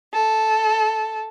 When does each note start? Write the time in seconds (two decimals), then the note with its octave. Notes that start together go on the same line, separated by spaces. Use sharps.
0.13 A4